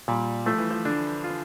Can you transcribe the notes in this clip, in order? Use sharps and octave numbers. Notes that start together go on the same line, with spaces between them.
A#2 G3
F3 A3
E3
F3
D3 D4
F4